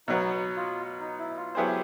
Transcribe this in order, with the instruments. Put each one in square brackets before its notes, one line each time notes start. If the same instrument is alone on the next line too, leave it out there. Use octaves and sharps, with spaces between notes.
[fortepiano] B2 F#3 B3 [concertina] D#4
[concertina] F4
D#4
E4
F4
[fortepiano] F#3 B3 E4 G#4 C5 [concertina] G4